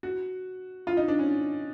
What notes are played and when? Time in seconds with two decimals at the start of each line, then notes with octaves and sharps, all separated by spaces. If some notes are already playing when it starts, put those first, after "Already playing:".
0.03 F#4
0.87 F4
0.97 D#4
1.08 D4
1.19 C#4